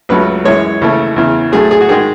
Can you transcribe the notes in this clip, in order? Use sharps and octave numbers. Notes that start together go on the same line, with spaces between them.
C#2 C#3 F#3 A3 B4
F#2 E3 G#3 C#5
D#2 C#3 E3 A3
E2 C#3 E3
A2 F#3 A3 G#4
G#4
F#4
G#2 D#3 G#3 G#4